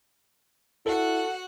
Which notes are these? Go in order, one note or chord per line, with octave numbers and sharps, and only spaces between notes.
E4 F#4 A4 F#5